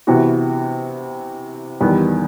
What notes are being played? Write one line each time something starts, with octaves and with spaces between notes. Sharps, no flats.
C3 E3 B3 F#4
E2 D#3 G3 B3